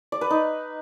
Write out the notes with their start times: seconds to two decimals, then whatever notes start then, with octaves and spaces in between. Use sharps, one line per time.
0.12 D5
0.21 B4
0.30 D#4